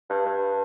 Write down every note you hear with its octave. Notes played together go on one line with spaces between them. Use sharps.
G2
G2